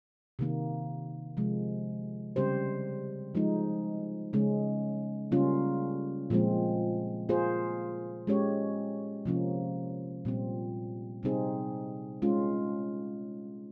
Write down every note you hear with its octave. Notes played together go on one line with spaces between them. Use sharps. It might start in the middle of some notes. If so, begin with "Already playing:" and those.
C3 D#3 A#3
C3 F3 G#3
C#3 G3 C4 G4 C5
F3 G#3 D#4
C#3 G#3 C#4
C#3 G3 A#3 C#4 F4
A#2 F3 G#3 C4
A#3 F4 G#4 C5
G#3 C#4 G4 C#5
C3 F3 A#3 C#4
A#2 G3 C4
C3 G3 C4 D#4 G#4
G#3 C#4 F4